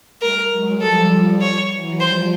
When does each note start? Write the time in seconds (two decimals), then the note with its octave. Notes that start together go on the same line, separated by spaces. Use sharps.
0.21 G3 A3 A#4
0.51 F#3 G#3
0.81 F3 G3 A4
1.41 C#5
1.71 E3 F#3
2.00 F3 G3 C5